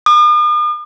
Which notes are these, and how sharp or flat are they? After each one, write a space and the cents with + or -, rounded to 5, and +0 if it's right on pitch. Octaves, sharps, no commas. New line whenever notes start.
D#6 -45